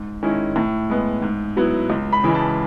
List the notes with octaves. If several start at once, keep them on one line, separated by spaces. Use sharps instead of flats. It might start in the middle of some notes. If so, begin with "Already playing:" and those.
Already playing: G#2
D#3 G#3 C#4 E4
A2
G#3 B3
G#2
F#3 B3 E4
C#2
B5
C#3 E3 G#3
A5